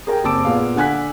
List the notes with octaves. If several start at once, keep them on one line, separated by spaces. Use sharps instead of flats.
G#4 A#4 G5
F#1 C4 A5 D6 E6 D7
A#2 B3 G#4 F5
D3 F#5 G#5 F#6 B6